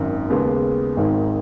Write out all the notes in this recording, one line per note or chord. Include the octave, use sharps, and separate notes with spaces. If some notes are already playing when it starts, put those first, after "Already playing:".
Already playing: G#1 F#2 D#3
D#2 C#3 G#3 B3
G#1 G#2 D#3